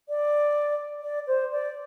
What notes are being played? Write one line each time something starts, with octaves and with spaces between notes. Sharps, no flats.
D5
D5
C5
D5